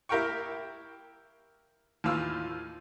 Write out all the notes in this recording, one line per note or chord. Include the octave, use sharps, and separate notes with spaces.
E4 G4 A#4 F5 G5 C#6
D#2 A2 E3 F4 E6